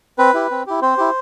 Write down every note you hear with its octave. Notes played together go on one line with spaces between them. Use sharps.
C4 B4
E4 G4
C4
E4 G4
C4 C5
E4 G4